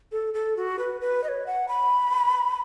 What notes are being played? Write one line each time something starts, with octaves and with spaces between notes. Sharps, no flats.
A4
A4
F#4
B4
B4
D#5
C#5
F#5
B5